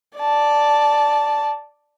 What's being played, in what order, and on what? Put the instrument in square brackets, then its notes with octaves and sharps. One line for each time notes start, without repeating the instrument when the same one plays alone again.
[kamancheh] D5 A5